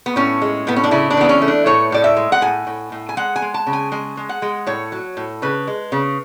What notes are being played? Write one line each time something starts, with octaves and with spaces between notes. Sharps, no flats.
B3
A2 C#4
G#3
A2 B3
C#4
D4
C#3 E4
D4
E3 B3
C#4
A3
D4
A2 C#5
A2 D5
E5
G#3
F#5
A2 G#5
A2
A2
G#5
G#3 F#5
G#5
G#3
A5
C#3
G#5
G#3 G#5
G#3
F#5
G#3
A2 C#5
F#3
A2
C#3 B4
G#3
C#3